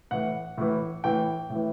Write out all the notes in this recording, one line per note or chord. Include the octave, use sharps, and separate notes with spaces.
A2 E3 F#5
A2 E3
A2 E3 G5
A2
E3